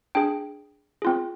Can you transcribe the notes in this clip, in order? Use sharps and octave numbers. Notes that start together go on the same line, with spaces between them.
D4 G#4 G5
C4 F4 G#4